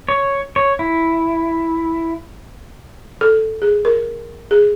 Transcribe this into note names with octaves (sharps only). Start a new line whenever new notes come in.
C#5
C#5
E4
A4
G#4
A#4
G#4